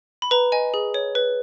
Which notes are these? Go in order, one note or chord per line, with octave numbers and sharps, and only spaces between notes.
B5
B4 A#5
D#5 G#5
G#4
C#5
B4